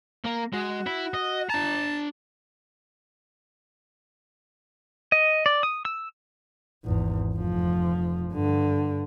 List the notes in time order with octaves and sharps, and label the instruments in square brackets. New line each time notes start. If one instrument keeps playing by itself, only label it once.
[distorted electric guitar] A#3 A#4
[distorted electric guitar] G#3 [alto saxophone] F#4
[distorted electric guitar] E4
D#5
[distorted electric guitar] D4 A#5 [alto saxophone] A5
[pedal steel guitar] D#5
D5
D#6
E6
[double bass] G#1 E2
F1 F3
G2 D3